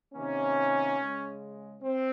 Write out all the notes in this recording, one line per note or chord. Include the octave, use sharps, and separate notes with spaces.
C3 D#3 A#3 C#4
C#3 G#3
C4